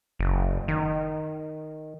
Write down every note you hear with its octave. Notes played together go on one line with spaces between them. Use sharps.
F#1
D#3